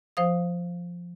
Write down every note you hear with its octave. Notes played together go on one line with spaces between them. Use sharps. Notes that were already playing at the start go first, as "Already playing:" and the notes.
F3 C5 F5 D#6